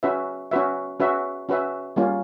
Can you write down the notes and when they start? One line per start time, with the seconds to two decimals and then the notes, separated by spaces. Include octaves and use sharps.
0.03 C#4 F#4 B4 E5
0.51 C#4 F#4 B4 E5
1.00 C#4 F#4 B4 E5
1.49 C#4 F#4 B4 E5
1.96 G3 A#3 C#4 F4